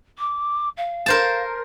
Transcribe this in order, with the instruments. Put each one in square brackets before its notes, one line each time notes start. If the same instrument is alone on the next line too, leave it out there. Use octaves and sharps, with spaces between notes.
[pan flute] D6
F5
[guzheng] A#4 C5 A5